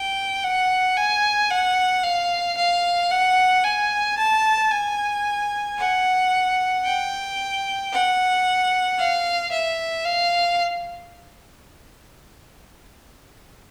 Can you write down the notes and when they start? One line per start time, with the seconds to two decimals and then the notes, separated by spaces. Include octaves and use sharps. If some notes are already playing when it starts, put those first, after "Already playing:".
Already playing: G5
0.44 F#5
0.97 G#5
1.50 F#5
2.04 F5
2.57 F5
3.11 F#5
3.64 G#5
4.18 A5
4.71 G#5
5.78 F#5
6.85 G5
7.92 F#5
8.99 F5
9.52 E5
10.05 F5